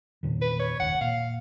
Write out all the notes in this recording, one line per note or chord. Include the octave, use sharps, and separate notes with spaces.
E2 A#2 D#3
B4
C#5
F1 D#2 F#5
A#2 F5